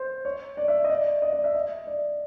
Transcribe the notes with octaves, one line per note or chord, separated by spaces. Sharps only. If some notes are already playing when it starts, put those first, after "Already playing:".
Already playing: C5
C#5
D5
E5
D#5
D5
D#5
D5
E5
D#5
D5